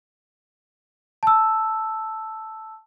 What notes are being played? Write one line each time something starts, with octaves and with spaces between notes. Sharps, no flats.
A5 E6